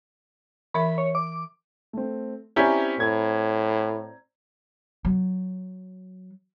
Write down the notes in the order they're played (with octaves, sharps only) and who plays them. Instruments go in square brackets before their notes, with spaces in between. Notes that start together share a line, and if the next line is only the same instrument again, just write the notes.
[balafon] E3 A#4 E5 [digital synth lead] B5
[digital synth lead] C#5
D6
[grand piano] A3 C4
[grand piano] C4 D5 A#5 [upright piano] C#4 E4 G4
[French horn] A2 [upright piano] G#6
[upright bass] F#3